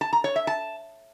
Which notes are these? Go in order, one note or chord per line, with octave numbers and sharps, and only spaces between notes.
A5
A#5
C#5
E5
A5